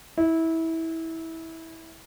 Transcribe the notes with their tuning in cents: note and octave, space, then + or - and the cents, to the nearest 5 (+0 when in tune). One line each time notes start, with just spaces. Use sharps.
E4 -20